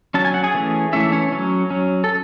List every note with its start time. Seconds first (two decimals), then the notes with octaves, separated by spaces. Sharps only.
0.14 F#3 C#4 A5
0.25 G#5
0.34 F#5
0.44 G#4 G#5
0.54 E3 A3 C#4
0.93 E3 A3 C#4 E4 E5
1.12 C#4 C#5
1.32 F#3 C#4
1.70 F#3 C#4
2.04 A4